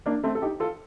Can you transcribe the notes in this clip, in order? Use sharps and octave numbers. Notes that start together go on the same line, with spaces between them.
A#3 D4
A3 C4
A4
D#4 G4
F4 A4